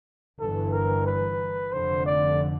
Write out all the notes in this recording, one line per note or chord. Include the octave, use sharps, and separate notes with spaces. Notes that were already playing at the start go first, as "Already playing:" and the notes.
G1 G2 E3 A4
A#4
B4
F1 F2 D3 C5
D5